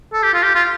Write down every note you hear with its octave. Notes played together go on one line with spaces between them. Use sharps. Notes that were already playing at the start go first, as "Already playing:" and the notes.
A4
G4
F4
G4
F4